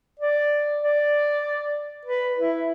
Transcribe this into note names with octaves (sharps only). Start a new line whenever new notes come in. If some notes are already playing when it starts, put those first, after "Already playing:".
D5
D5
B4
E4